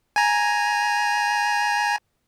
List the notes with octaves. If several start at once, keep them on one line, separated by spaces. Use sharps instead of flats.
G#5 A#5